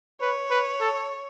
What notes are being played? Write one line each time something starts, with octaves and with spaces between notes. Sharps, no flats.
B4 C#5
B4
A4